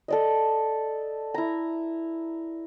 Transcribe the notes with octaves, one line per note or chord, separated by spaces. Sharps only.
A4 D5 D#5
E4 A#5